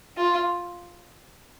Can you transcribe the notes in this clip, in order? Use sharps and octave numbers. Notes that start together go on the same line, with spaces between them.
F4